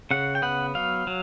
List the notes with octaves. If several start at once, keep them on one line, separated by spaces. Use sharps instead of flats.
C#3 F#5
G5
B3 F#5
F#3 F5
F#3